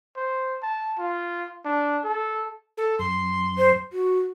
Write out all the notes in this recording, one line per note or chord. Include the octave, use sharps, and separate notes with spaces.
C5
A5
F4
D4
A4
A4
F#2 C6
C5
F#4